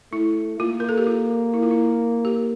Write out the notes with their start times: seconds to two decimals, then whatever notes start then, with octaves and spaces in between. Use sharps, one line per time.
0.12 A3 E4
0.59 A#3 F4
0.80 A#4
0.89 A4
0.98 G4
1.07 F4
1.54 E4
1.62 F4
1.71 E4
2.25 G4